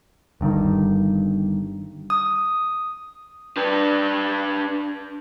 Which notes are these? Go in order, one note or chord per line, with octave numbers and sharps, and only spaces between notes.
G1 G2 C3 D#3
D#6
D4 B4